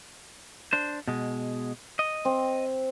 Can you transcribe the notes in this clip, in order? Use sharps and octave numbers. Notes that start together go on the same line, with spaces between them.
D4 C5
B2 G#3
D#5
C4